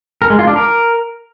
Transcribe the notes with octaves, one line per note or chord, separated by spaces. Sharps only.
A#4
G#3
F4
D4
A#4